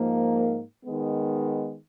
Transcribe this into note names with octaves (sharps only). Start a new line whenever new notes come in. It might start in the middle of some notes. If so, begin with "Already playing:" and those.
Already playing: G#2 F3 A#3
D#3 G#3 B3